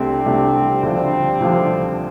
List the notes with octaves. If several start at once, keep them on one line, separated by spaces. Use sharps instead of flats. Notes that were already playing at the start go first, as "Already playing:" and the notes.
Already playing: C2 C3 G3 A3 C4 D4 G4
C2 C3 A3 D4 G4
D2 D3 F3 G3 C4 D4
D2 D3 F3 D4